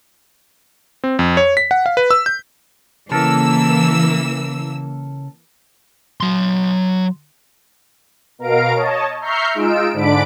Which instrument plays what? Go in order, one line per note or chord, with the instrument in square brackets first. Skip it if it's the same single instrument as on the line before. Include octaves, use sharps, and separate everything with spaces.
[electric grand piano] C4
F2
C#5
B6
F#5
F5
B4
E6
G6
[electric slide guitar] C#3 A4 A#4 [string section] E3 A#3 E6
[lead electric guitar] F#3 C6
[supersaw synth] B2 A#4 F5 A#5 D7
C#5 D#5 A5
E5 A#5 C#6 F6 G6 C7
G#3 D#4 F4 E6 D7
G#2 D3 D4 B5 D6 D7